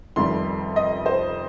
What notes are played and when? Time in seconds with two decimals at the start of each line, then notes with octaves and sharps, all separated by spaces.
0.16 F1 F2 C3 D#3 G3 C6
0.76 D#5
1.06 C5